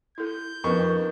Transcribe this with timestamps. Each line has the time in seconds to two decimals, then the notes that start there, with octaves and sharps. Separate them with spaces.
0.18 E4 A4 G6
0.64 F2 D#3 B3 C#4 B4 C#6